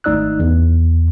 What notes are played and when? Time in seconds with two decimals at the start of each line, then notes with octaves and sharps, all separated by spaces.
0.04 G#1 A3 D#4 D5 E6 F#6
0.39 E2